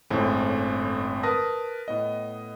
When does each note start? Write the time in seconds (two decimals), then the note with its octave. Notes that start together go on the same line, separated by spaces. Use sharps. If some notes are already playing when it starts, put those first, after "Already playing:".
0.10 G1 F2 A2 G#3 C4 C#4
1.23 A#4 B4 A5 D#6 A#6
1.88 A2 B3 D#5